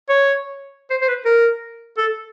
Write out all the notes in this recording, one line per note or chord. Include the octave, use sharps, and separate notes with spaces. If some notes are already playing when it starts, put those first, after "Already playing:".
C#5
C5
C5
B4
A#4
A4